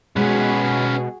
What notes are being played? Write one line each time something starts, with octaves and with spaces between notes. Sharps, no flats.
B2 G#3 C#4 F#4 G#4 B4